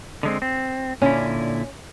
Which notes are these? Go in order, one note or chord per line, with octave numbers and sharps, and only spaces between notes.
D3 G#3 C4
C4
A#2 D3 C#4 E4